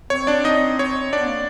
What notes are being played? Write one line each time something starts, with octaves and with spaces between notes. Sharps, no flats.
C4 C#5
D4 D5
C4 D#4 D#5
C#5
C4 D4 D5
B3
A#3